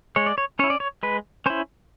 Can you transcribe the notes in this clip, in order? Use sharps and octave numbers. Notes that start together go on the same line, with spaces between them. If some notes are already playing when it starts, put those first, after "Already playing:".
G#3 C#5
D5
C#5
C#4 E4 C#5
D5
C#5
G#3 B4
C#4 E4 C5